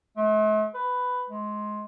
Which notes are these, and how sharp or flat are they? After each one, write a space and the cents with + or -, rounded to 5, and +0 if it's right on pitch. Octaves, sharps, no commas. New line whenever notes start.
A3 -45
B4 +10
G#3 +20